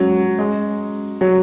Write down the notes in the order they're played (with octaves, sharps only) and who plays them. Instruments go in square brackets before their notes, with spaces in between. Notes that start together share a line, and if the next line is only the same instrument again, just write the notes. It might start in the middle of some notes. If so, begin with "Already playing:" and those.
Already playing: [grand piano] F#3 [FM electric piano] G#3 C#4
[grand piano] G#3
F#3